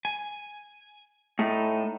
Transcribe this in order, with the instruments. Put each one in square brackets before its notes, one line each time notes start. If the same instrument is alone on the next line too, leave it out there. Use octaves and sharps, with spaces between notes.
[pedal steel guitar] G#5
[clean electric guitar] A2 [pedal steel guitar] D#4 A4